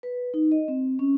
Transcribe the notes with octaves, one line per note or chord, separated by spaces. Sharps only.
B4
D#4
D#5
C4
C#4